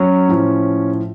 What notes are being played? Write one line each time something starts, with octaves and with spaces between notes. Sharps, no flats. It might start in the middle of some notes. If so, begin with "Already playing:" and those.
Already playing: F#3 C#4
A2 F3